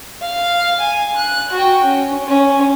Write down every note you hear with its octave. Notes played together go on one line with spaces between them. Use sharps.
F5
G#5
F#6
F#4 G5
C#4
C#4